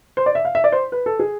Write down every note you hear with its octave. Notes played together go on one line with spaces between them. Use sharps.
C5
D5
E5
F5
E5
D5
C5
B4
A4
G#4